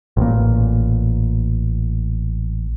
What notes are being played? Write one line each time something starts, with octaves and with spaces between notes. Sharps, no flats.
A1 A#2